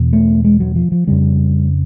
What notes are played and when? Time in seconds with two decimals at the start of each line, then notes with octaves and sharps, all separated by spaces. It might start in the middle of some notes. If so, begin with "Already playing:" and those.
Already playing: E2 B2
0.13 A3
0.44 G#3
0.60 F#3
0.76 F3
0.92 F3
1.07 F2 C#3 G3